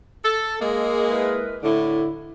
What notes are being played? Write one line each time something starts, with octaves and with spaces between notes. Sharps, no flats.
A4
G#3 A#3
E4 A#4 B4
A2 D3 E4